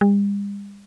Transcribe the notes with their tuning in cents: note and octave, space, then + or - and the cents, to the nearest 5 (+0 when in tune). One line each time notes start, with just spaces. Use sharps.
G3 +45